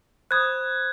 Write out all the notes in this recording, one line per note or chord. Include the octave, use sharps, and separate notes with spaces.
C5 B5 D#6 F#6 G#6